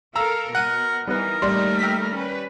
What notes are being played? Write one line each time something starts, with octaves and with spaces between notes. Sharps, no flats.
A4 A#4 F5 A#5 E6
B2 A#4 F#5 F#6 D#7
E3 G3 B3 D#4 A#4 B4
A1 D#2 G3 A3 D#4 D5 C6
G5 E6 B6
C#4 B4